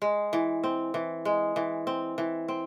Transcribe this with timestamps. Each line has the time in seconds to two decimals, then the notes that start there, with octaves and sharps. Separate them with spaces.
0.02 G#3
0.33 E3
0.63 C4
0.94 E3
1.25 G#3
1.56 E3
1.87 C4
2.18 E3
2.48 C4